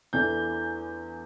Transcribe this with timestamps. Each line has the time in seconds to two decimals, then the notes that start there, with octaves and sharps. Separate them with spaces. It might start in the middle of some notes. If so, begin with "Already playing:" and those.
0.13 E2 E3 A3 D4 G6